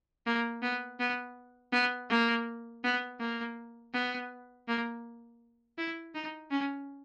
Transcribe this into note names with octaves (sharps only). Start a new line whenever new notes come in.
A#3
B3
B3
B3
A#3
B3
A#3
B3
A#3
E4
D#4
C#4